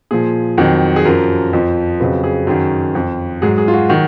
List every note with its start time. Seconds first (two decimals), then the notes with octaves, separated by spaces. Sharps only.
0.11 A#2 F3 G#4
0.58 F2 D#3 F#3
0.96 G#4
1.05 F#2 F3 A#4
1.53 F2 F3
2.00 F2 C#3 F#3 B4
2.24 G#4
2.47 F#2 D#3 F#3
2.95 F2 F3
3.42 G#2 F#3 G#4
3.58 G#4
3.68 F4
3.73 F#4
3.89 D#3 F#3 F#4